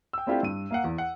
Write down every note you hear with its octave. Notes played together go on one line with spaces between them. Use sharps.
G5 E6
A3 C4 D4 E4 F4 G4
G2 D#7
A#3 F5 F#5
E2
F#5